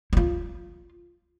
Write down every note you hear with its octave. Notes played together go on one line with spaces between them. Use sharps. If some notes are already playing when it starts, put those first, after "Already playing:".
E4 F4